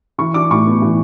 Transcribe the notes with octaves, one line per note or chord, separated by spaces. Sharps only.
E3 C#6
D4 D6
A2 C#6
B3
E3